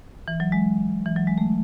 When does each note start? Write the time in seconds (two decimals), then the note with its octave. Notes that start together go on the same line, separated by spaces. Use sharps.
0.28 E3
0.40 F#3
0.52 G#3
1.06 E3
1.16 F#3
1.27 G#3
1.38 A3